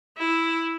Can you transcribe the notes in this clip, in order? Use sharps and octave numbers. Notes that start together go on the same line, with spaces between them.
E4